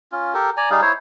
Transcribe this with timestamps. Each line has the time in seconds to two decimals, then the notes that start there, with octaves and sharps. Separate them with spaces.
0.12 C#4 F4
0.34 G4 A4 A#4
0.57 D5 G#5 A#5
0.70 G3 D#4 G#4 F5
0.82 E4 C5 C#5